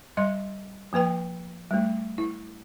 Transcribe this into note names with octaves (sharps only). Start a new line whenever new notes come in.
G3 D#5 C6
F3 A#3 B4 G5
G3 A3
E4